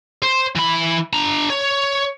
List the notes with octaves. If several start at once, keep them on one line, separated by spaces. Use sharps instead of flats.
C5
E3 B5
D4 A#5
C#5